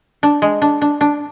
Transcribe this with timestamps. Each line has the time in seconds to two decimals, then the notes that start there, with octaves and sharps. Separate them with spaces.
0.23 D4
0.42 G#3
0.62 D4
0.82 D4
1.01 D4